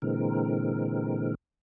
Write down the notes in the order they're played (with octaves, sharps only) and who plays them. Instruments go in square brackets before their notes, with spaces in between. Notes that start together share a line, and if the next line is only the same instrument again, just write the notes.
[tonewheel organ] A#2 D3 E3 G#3 C4 A#4